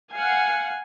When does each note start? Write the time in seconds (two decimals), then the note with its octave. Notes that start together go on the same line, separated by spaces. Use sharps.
0.13 F5 F#5 G#5